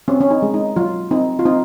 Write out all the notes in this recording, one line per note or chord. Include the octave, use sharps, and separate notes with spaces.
C4 C#4
C#4
D#4
G#3
D#4
F#3 F4
C4 D#4
F4
C4 D#4